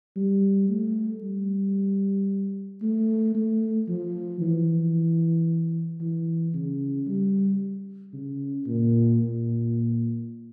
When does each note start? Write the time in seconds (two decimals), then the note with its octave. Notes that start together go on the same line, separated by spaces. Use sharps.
0.16 G3
0.69 A3
1.22 G3
2.82 A3
3.35 A3
3.88 F3
4.41 E3
6.01 E3
6.54 C#3
7.07 G3
8.13 C#3
8.66 A#2
9.20 A#2